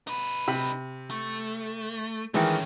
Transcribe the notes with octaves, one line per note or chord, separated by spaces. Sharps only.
D#4 B4
C3 B5
A3
D#3 E3 G#3 A3 C#4